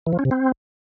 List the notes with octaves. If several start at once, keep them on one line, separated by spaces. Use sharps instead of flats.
E3
F3
C#4
C3
C4